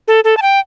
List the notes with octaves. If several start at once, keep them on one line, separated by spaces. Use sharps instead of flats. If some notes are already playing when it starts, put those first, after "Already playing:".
A4
A4
A5
G5